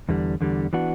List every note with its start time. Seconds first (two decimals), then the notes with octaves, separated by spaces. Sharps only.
0.09 E2 D3 G3
0.41 E2 D3 G3
0.73 E3 B3 D4 F#4